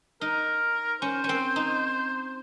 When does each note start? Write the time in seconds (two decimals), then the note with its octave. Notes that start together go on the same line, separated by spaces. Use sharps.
0.21 D#4 A#4
1.02 C#4 C5
1.24 C#4
1.29 C4
1.56 D#4